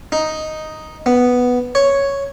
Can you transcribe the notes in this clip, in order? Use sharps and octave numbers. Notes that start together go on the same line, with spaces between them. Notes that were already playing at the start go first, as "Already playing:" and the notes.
D#4
B3
C#5